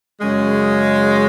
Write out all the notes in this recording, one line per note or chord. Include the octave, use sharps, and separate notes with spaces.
F#2 C#3 G#3